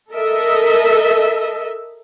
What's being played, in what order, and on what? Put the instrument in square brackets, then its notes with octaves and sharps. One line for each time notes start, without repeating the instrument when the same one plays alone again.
[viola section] A4 A#4 D#5 E5